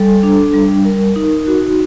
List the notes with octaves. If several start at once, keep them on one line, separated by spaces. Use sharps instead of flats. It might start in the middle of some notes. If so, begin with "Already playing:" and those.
Already playing: G3 A4
D4
G3
A#4
D#4
F#4